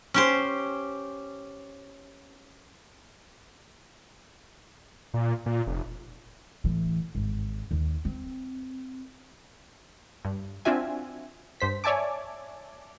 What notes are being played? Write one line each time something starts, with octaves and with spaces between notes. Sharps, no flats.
C#4 G4 C5
A#2
A#2
F1
A2 E3
G#1
D#2
C4
G2
C4 D4 F4 F#4 E5 G#5
G2 C5 B6
C#5 D5 E5 G#5 A5 D6